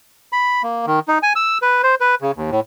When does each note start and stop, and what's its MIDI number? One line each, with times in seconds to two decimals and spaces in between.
0.33 0.62 83
0.63 0.86 58
0.87 1.00 51
1.08 1.18 63
1.23 1.33 80
1.36 1.58 88
1.62 1.82 71
1.83 1.95 72
2.01 2.15 71
2.22 2.31 49
2.36 2.50 39
2.51 2.60 45